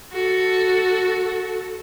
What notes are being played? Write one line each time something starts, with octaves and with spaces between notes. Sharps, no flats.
F#4 A4